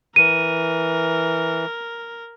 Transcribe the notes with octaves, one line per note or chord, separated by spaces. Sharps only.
E3 A#4 D#7